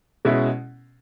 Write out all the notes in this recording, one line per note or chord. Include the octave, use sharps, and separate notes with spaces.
B2 G#3 C#4 E4